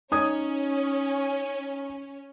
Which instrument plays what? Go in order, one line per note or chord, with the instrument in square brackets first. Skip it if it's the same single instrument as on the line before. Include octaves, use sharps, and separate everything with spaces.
[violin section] C#4 [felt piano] D#4 D#6 G#6